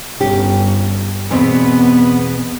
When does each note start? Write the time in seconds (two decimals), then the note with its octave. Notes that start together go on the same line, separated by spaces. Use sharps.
0.20 G1 C#4 G4
1.30 E2 B2 B3 C4